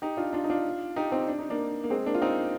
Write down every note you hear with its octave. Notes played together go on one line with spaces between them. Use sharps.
D#4 G4
D4 F4
D4 F4
D#4
D4 F4
D#4 G4
C4 D#4
D4
D#4
A#3 D4
A#3
G#3 C4
A#3 D4
F4
C4 D#4